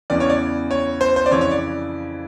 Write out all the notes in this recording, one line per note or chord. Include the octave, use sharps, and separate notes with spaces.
E2 C#3 E3 D5
C#5
D5
C#5
C5
C5
D5
F2 C#3 E3 C#5
C#5
D5